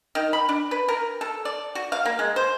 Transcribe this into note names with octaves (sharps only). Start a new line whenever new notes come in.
D#3
B5
D4
B4
A#4
A4
D5
F#4
F5
A#3
G#3
C5